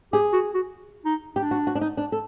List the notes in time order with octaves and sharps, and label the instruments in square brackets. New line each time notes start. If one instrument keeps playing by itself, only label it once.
[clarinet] G4 [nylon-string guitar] G#4
[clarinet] F#4
F#4
D#4
[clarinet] D4 [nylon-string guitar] G4
[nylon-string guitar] F#4
F#4
D4
D#4
D4
A4